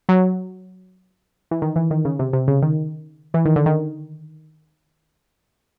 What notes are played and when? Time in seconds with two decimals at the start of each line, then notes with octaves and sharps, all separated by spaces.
0.09 F#3
1.51 E3
1.62 D#3
1.76 E3
1.91 D#3
2.05 C#3
2.19 C3
2.33 C3
2.48 C#3
2.62 D#3
3.34 E3
3.45 D#3
3.56 D3
3.66 D#3